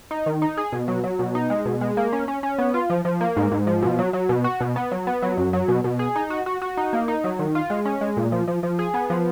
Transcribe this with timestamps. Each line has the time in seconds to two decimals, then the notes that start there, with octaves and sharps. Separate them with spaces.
0.11 D#4
0.26 D#3
0.42 D#4
0.57 G#4
0.72 B2
0.88 F#3
1.04 F#3
1.19 B2
1.35 D#4
1.50 G#3
1.65 B2
1.81 G#3
1.97 A#3
2.12 C#4
2.28 C#4
2.43 C#4
2.58 B3
2.74 F4
2.90 F3
3.05 F3
3.21 A#3
3.37 G#2
3.52 G#2
3.67 F3
3.82 B2
3.99 F#3
4.13 F#3
4.29 B2
4.44 F#4
4.61 B2
4.76 B3
4.91 F#3
5.07 B3
5.22 F#3
5.37 F#2
5.53 F#3
5.68 B2
5.84 B2
5.99 G#4
6.16 D#4
6.30 F#4
6.46 F#4
6.62 F#4
6.77 D#4
6.93 A#3
7.08 D#4
7.24 F#3
7.39 D#3
7.55 F4
7.70 G#3
7.85 C#4
8.01 G#3
8.17 A#2
8.32 F3
8.48 F3
8.63 F3
8.79 G#4
8.94 B3
9.10 F3